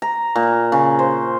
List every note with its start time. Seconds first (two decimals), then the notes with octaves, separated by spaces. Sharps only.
0.02 A#5
0.36 A#2
0.72 C#3
0.99 C5